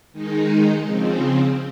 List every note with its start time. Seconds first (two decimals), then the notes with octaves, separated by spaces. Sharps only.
0.12 D#3 G#3 D#4
0.82 C#3 F3 C4